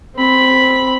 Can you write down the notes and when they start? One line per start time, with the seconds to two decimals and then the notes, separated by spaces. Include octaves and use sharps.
0.15 C4 B5